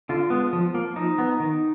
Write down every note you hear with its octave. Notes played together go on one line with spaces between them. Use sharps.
D3 F4
G#3 B3
F3
A#3
F3 D#4
B3
D#3